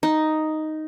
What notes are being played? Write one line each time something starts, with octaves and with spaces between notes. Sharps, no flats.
D#4